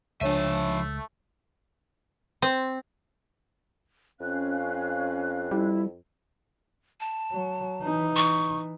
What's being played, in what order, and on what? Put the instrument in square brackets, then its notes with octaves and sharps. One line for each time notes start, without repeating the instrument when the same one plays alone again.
[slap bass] C#2 [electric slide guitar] F3 E5 [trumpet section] A3 [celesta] D4 C#5 D#7
[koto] C4
[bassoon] F2 [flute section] C#4 F5 F#6
[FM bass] G3 [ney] E4
[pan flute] A5
[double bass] F#3
E3 D#4
[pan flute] C#6